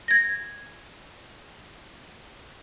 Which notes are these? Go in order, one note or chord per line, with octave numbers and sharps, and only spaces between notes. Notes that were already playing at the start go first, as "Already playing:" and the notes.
G#6 A#6